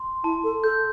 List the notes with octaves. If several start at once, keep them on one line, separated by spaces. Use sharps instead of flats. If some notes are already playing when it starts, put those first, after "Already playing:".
Already playing: C6
E4 A5
A4
A4 G6